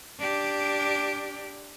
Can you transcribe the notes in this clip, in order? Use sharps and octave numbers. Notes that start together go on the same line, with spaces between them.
D4 G4